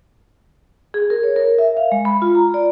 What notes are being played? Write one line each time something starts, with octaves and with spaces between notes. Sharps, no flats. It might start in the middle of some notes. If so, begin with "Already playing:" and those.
G#4
A#4
C#5
A#4
E5
F5
G#3
B5
F4
A#5
D5